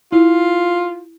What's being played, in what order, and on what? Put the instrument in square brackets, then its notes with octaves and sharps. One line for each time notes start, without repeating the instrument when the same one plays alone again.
[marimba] E4 [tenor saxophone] F4